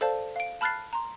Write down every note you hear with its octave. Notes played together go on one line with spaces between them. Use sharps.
A4 C5 D5 F5 A5
F5 D7
A5 B5 F6 F#6 A6 C7
A#5 C6